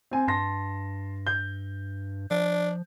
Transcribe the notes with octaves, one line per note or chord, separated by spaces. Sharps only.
C4 G#5
G2 A5 C6 A#6
G6
F3 D4